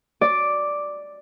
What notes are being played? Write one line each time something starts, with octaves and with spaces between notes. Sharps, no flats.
D5